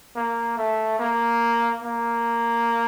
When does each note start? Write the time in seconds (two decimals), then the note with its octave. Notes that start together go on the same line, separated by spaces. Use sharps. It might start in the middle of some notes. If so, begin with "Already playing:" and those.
0.16 A#3
0.58 A3
0.99 A#3
1.83 A#3